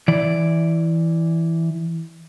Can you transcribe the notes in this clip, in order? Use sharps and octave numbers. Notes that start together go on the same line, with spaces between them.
E3 D5